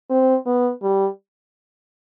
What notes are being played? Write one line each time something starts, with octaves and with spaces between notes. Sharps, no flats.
C4
B3
G3